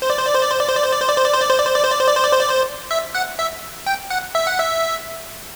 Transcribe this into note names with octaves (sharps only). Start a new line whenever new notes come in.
C5
D5
C5
D5
C5
D5
C5
D5
C5
D5
C5
D5
C5
D5
C5
D5
C5
D5
C5
D5
C5
D5
C5
D5
C5
D5
C5
D5
C5
D5
C5
E5
F#5
E5
G5
F#5
E5
F#5
E5